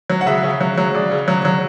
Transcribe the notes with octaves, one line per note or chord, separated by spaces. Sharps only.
F#3
F#5
C#3 E5
C#3
F#3
F#3
C#3 D5
C#3
F#3
F#3